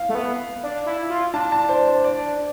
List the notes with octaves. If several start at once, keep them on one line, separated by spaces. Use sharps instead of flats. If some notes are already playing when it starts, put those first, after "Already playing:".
Already playing: F5
A3
B3
D4
E4
F4
D4 A5
A5
C5
C5
D5